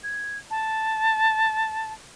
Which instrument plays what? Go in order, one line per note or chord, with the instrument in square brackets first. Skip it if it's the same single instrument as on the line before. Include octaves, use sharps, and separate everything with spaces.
[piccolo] G#6
A5